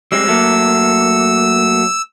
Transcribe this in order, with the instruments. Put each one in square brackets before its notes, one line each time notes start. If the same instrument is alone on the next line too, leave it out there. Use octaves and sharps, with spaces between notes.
[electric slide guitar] G3 G#3 C4 [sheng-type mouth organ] E6
[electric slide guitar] F#3 A3 A#3